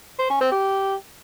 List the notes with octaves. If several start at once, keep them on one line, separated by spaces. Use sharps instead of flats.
C5
C#4
C4
G4